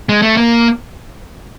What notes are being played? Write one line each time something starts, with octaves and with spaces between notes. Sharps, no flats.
G#3
A3
A#3